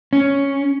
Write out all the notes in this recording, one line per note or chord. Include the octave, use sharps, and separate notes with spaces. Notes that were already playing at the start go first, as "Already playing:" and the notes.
C#4